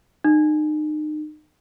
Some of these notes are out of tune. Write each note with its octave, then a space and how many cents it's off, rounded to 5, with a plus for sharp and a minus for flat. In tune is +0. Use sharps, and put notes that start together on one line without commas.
D#4 -35